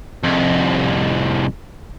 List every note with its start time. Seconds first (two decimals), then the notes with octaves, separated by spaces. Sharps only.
0.23 C2 F2